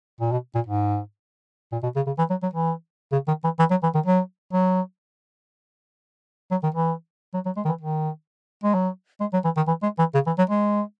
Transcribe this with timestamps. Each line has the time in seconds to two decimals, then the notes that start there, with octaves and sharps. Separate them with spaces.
0.21 A#2
0.32 B2
0.55 A#2
0.67 G#2
1.73 A#2
1.83 B2
1.96 C#3
2.07 C#3
2.19 E3
2.30 F#3
2.43 F#3
2.54 E3
3.13 C#3
3.28 D#3
3.44 E3
3.59 E3
3.71 F#3
3.83 E3
3.95 D#3
4.06 F#3
4.53 F#3
6.51 F#3
6.64 D#3
6.75 E3
7.34 F#3
7.46 F#3
7.57 G#3
7.65 D#3
7.68 E3
7.81 D#3
8.64 G#3
8.75 F#3
9.21 G#3
9.33 F#3
9.45 E3
9.57 D#3
9.68 E3
9.83 G#3
9.99 E3
10.14 C#3
10.27 E3
10.38 F#3
10.50 G#3